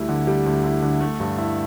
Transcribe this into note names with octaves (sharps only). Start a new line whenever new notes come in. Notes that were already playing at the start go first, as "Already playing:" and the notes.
Already playing: D2 G3 E4
D3
G3
D2
E4
D3
A3
G2
E4